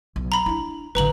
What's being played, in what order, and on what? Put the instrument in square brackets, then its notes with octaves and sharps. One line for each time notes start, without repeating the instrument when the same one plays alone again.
[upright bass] B1
[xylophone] A#5 B5
[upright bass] D4 E4
[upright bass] A1 D3 [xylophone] B4 A#5 F#7